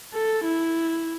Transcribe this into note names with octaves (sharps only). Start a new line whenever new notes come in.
A4
E4